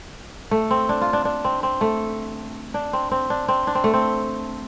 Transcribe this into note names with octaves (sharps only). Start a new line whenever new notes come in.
A3
C4
D4
F4
D4
D4
C4
C4
A3
D4
C4
C4
D4
C4
D4
C4
A3
C4